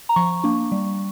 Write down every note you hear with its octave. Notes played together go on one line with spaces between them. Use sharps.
A#5
F3 C#6
A#3 D4
G3